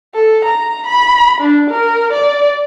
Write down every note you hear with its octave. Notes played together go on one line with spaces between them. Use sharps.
A4
A#5
B5
D4
A#4
D5